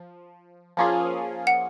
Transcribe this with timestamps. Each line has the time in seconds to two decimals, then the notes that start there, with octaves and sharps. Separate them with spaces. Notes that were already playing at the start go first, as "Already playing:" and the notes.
Already playing: F3
0.77 F3 A#3 C#4 F4 G#4
1.47 F#5